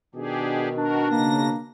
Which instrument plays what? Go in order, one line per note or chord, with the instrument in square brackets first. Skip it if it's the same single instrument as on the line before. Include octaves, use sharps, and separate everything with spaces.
[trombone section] B2 D#3 [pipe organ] D4 G4 G#4
[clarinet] D4 [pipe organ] F#4 A#4
[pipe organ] C#3 A#6 [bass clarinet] A#3